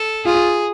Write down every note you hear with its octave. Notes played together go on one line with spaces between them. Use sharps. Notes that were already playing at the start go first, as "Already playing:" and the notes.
Already playing: A4
F4 G#4